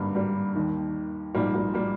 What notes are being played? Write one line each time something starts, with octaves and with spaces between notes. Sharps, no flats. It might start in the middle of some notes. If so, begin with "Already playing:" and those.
Already playing: G#1 G2 D3 G3 A#3
G3 A#3
D#2 D#3
A#1 G#2 F3 G3 A#3
G3 A#3
G3 A#3